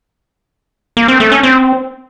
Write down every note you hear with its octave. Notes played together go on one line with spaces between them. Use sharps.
A#3
C4
A3
C#4
C4